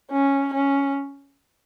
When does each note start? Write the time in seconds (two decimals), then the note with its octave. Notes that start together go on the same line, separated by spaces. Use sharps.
0.11 C#4
0.54 C#4